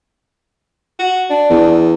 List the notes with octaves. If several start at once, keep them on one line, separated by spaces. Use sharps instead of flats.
F#4
D4
E2